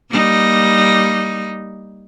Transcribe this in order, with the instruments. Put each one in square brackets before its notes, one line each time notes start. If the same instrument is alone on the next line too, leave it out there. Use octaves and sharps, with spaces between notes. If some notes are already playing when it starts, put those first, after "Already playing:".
[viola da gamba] G3 A#3 D#4